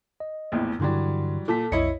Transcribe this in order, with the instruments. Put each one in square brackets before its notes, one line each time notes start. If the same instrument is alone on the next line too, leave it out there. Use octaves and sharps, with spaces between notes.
[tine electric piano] D#5
[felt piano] A#1 E2 A2
[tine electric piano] G2 D3 C6 [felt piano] E3 F#3 G3
[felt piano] A#2 B6 [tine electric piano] A4 A5
[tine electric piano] B1 F2 C#7 [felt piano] E4 C#5 D#5